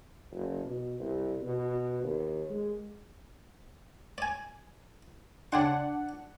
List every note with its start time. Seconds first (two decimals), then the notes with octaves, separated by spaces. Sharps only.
0.31 F#1
0.65 B2
1.00 C2
1.41 B2
2.04 D#2
2.50 G#3
4.18 D5 G#5
5.52 C#3 D4 F#5 G5 C6